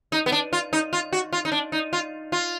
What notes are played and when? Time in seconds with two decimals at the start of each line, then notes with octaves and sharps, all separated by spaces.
0.12 D#4
0.26 B3
0.32 D4
0.53 F4
0.73 D#4
0.93 F4
1.13 F#4
1.33 F4
1.45 D#4
1.52 D4
1.72 D#4
1.93 F4
2.32 F4